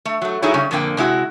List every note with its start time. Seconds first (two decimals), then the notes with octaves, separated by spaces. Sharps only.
0.05 A3
0.22 F#3 A3
0.42 F#3 D#4 E4 G#4 A4 C#5
0.54 C#3 G3 C#4
0.71 F2 A#2 D3 A#3 G5
0.97 C3 G#3 E4 F#4